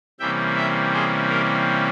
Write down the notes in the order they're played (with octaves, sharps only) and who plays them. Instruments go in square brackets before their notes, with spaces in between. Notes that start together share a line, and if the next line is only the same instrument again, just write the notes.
[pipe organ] C3 E3 G3 A#3 C#4 E5 G5
E5 G5
G#4 C5
G4 A#4